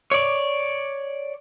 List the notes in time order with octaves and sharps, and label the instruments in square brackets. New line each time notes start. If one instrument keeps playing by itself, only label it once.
[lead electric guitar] C#5 D5